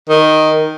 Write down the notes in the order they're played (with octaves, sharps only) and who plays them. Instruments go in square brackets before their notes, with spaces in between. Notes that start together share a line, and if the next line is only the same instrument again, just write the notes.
[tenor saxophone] D#3